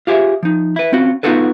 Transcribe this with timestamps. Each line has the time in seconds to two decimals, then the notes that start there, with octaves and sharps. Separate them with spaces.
0.07 F4 G4 G#4 C5 E5
0.43 F3 D#4
0.76 E4 B4
0.93 C4 C#4 F4 F#4
1.23 B3 D#4 F4 F#4 A4 B4